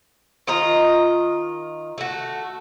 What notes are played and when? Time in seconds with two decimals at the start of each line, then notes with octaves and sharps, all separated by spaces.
0.47 D#3 F4 D#5 A#5
1.98 A3 F#4